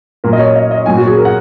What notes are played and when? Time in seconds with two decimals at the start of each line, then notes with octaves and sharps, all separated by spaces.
0.24 A#2 F#3 A#4
0.33 D#5
0.39 C#5
0.56 D#5
0.71 D#5
0.86 A#2 F#3 G#5
0.97 F#4
1.07 G#4
1.17 A#4
1.25 F#5